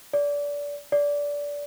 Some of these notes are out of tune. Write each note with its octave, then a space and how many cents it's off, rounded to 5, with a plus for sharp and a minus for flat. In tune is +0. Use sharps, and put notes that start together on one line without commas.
D5 -25
D5 -20